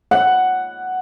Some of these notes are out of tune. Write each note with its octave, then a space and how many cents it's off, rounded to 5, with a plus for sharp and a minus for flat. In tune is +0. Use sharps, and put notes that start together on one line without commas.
F#5 +5